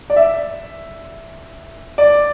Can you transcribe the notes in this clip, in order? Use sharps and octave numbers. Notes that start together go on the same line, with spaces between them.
D5
E5
D5